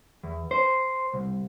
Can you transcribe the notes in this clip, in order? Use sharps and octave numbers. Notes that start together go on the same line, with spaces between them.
E2
C5
C2